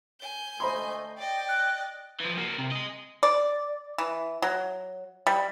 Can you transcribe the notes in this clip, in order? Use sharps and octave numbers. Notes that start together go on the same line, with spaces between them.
G#5 G6
D2 A3 C5 D#5 B5 C6
D5 D#5 G5
F#6
E3 F3
A#3 F#4
C3
G#4 D#5
D5
E3
F#3
G3